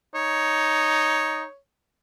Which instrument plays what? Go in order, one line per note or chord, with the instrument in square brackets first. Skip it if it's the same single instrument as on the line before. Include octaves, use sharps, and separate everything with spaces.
[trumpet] D#4 [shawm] C#5